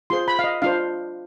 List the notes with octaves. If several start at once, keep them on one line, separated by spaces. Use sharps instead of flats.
F4 G#4 C5 C6
B5
F5
D#5
D4 F4 C5 F5